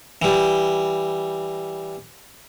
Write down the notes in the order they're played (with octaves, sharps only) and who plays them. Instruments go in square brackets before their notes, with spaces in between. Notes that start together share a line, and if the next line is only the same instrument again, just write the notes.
[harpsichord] E3 G3